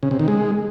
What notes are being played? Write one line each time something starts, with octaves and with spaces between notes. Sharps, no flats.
C#3
C3
D#3
G#3